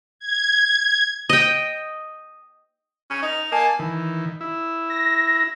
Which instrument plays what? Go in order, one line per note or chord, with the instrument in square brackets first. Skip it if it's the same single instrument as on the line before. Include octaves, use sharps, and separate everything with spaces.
[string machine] G#6
[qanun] D#5 G5
[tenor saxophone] C#4
D#4
[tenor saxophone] A#3 [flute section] G#5 A5
[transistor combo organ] D#3 E3
E4
[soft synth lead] A#6